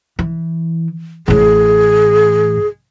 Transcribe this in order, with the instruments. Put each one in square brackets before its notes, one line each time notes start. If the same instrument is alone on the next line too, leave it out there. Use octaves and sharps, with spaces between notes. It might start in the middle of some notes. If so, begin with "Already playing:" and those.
[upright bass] E3
[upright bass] A1 A2 [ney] G#4